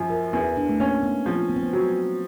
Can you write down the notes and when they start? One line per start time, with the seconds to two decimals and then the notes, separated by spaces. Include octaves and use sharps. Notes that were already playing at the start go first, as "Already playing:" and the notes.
Already playing: F#2 F3
0.10 A#4
0.33 E2 E4
0.57 D4
0.69 A3
0.80 A#3 C#4
1.03 B3
1.26 F3 C4
1.49 B3
1.56 C4
1.63 B3
1.73 F#3